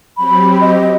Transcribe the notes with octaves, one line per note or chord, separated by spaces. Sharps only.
F#3 C4 G4 B5
D#5